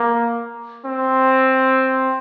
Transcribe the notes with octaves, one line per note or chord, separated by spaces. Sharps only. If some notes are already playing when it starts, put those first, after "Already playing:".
Already playing: A#3
C4